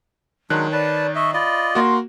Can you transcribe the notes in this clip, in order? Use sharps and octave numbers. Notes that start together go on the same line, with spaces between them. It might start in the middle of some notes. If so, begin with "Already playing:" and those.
D#3 F#3 G#3 D4 C#5 F#6
B4 D5 A5
D#5 E5 C#6
F4 D5 D#5 B5
A#3 F#4 C6